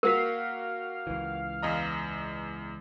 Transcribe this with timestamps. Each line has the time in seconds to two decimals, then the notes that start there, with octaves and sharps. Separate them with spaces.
0.03 A#3 F#4 A#4 F5 B6
1.07 C#2 E3
1.63 E2 D#5 A#5